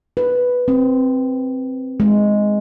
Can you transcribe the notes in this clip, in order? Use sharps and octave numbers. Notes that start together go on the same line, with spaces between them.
B4
C4
G#3